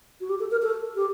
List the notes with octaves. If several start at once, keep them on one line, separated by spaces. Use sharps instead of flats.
F#4
G4
A4
A#4
A4
G4